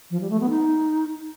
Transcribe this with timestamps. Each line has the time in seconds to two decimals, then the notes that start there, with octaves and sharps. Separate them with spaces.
0.11 F3
0.21 G3
0.30 A3
0.40 B3
0.49 D#4